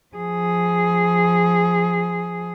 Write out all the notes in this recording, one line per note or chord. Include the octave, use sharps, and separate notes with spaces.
F3 G#4